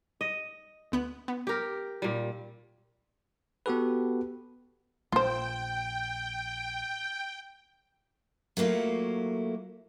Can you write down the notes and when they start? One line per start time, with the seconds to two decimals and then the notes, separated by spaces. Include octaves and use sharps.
0.21 D#5
0.92 D2 B3 F#6
1.28 B3
1.47 G4 A#4
2.02 A#2 G3
3.66 B3 F#4 G4 A4 B4
5.12 A#1 F4 C5 G5
8.57 F#3 A3 A#3 E4 F4